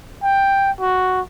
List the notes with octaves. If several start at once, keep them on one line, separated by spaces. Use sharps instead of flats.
G5
F#4